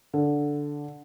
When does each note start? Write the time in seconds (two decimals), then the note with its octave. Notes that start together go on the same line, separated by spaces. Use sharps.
0.14 D3